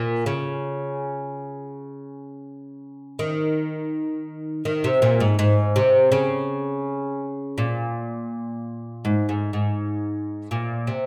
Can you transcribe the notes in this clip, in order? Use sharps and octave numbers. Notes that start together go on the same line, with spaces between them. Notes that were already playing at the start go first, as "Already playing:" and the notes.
Already playing: A#2
C#3
D#3
D#3
C3
A#2
G#2
G#2
C3
C#3
A#2
G#2
G#2
G#2
A#2
C3